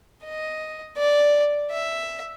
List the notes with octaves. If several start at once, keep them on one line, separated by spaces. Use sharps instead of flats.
D#5
D5
E5